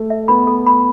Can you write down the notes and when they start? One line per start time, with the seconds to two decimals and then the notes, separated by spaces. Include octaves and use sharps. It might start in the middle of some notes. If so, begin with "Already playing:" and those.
Already playing: A3
0.10 E5
0.28 B3 B5
0.47 A4
0.67 B5